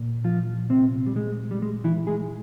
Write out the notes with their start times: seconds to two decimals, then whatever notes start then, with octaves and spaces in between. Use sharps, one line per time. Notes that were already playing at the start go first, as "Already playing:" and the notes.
Already playing: A#2
0.24 F3 F4
0.70 C3 C4
1.06 G3
1.16 G#3
1.51 G3
1.62 G#3
1.84 E3 E4
2.07 G#3 G#4